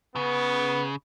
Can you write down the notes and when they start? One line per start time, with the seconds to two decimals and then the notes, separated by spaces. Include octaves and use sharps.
0.15 C#3 B3